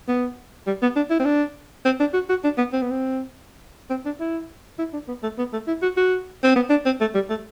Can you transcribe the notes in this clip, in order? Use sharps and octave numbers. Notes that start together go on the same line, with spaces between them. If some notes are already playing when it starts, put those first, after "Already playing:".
B3
G3
B3
D4
E4
C4
D4
C4
D4
F#4
F#4
D4
B3
C4
B3
C4
C4
D4
E4
E4
D4
B3
A3
B3
A3
E4
F#4
F#4
C4
B3
D4
C4
A3
G3
A3